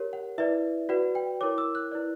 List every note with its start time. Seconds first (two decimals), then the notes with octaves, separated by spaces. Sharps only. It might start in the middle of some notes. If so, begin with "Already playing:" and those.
Already playing: G4 A#4 C#5
0.13 F#5
0.38 E4 B4 D5 E5
0.89 F#4 B4 D5 F#5
1.15 G5
1.41 E4 A#4 C#5 D6
1.58 E6
1.75 F#6
1.91 E4 B4 D5